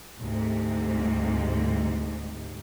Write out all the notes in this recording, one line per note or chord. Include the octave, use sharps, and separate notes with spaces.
D2 G#2 C3